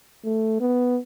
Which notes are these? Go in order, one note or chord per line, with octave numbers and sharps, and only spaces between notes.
A3
B3